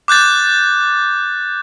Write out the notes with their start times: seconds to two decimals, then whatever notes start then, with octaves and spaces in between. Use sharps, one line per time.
0.08 D6 F#6 G6 A6